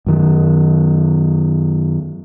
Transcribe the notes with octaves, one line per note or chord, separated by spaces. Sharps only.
F#2 D#3